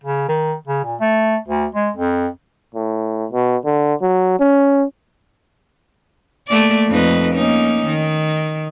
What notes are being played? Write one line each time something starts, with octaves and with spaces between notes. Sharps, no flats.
C#3
D#3
C#3
A#2
A3
D2
G#3
F2
A2
B2
D3
F#3
C#4
A3 A#3 D5
F2 D#4 B4
A#3 C#4 D#4
D#3